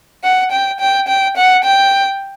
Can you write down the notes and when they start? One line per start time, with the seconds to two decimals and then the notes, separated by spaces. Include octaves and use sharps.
0.24 F#5
0.51 G5
0.80 G5
1.08 G5
1.36 F#5
1.64 G5